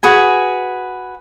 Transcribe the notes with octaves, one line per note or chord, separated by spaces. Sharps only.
F#4 G#4 B4 G#5